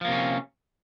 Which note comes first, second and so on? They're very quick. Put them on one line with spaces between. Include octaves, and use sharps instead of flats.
F3 A#3 C3 C#4